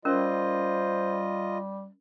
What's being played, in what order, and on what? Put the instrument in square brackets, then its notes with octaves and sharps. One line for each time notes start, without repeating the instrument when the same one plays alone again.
[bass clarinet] G3 [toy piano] C#4 A#4 [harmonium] F4 D#5 [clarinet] C5